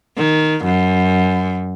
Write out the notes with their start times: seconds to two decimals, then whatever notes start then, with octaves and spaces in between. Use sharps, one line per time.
0.17 D#3
0.65 F#2